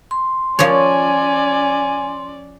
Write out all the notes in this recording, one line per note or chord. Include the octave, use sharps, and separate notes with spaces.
C6
F3 C#4 C#5 D5 G#5